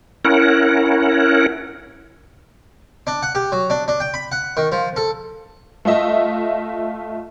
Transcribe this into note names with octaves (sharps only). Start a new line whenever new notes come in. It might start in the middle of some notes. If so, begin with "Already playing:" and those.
C#4 E4 A#4 F#5
D4
F#5
G4
F#3
D4
D4
G5
B5
F#5
D#3
F3
A4
A3 F4 D#5 E5